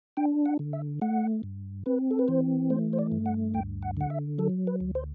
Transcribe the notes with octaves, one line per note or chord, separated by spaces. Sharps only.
D4 G5
F#5
D3
E5
A3 F#5
G2
C4 B4
A4
B4
E3 C5
A3 C5
C5
D5
G2
F#5
D2 G5
F#5
D3 F#5
E5
F#3 A4
B4
D2
C5